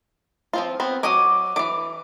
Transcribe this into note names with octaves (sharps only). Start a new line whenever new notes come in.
F3 C4 F4
B3 C4
F#3 D#5 G#5 D6 D#6
D#3 E3 D6